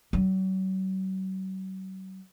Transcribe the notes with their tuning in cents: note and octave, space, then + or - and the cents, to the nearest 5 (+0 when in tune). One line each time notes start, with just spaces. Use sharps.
F#3 +40